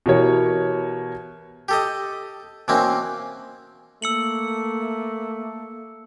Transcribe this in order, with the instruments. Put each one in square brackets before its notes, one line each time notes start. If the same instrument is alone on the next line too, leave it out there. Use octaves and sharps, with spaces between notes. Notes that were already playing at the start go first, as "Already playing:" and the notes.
[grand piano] B2 E3 G4 A#4 C#5
[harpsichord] G4 A4 D#5
B2 E3 A#3 C4 C#4
[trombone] A3 [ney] A#3 [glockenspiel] E6 C#7 F#7